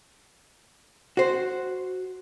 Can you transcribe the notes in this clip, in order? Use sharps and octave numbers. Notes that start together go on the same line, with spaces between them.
F#4 C5